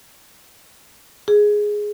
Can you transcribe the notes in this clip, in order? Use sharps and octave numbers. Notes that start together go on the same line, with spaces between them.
G#4